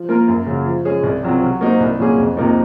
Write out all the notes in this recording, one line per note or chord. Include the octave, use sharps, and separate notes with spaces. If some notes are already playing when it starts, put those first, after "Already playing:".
Already playing: F3
A#3 F4 A#4
F#2
C#3 F#3
F3
G#3 C#4 G#4 C#5
C2
C3 F#3 C4 F4
F#3
A#3 D#4 F#4 C5
C2
A#2 F#3 C#4 G#4
F2
C3 F3 A#3 D#4